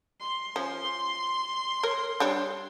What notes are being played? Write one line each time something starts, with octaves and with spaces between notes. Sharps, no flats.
C6
F3 C#4
A#4 C#5
G3 D4 C#5